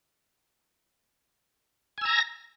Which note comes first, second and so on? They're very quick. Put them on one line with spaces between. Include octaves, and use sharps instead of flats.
G#5 E6 A#5 A#6